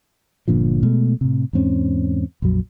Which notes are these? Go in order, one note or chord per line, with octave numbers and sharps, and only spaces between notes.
G1 A#2 D3 F3
B2 G#3 A3
A2 C3
E2 G#2 C4 C#4
A#1 F2 F#3